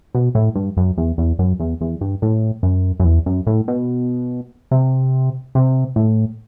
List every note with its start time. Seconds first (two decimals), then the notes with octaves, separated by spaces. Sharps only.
0.15 B2
0.35 A2
0.55 G2
0.77 F#2
0.97 E2
1.18 E2
1.39 F#2
1.60 E2
1.81 E2
2.01 G2
2.22 A2
2.63 F#2
3.00 F#2
3.04 E2
3.26 F#2
3.47 A2
3.68 B2
4.71 C3
5.55 C3
5.96 A2